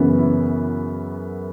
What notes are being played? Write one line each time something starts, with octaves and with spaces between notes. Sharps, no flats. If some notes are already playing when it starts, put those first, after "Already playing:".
Already playing: F#2 C#3 E3 B3
E4